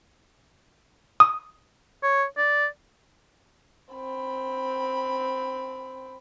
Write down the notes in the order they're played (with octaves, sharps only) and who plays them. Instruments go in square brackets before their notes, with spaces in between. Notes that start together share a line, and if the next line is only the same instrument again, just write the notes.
[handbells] D#6
[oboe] C#5
D5
[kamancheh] C4 B5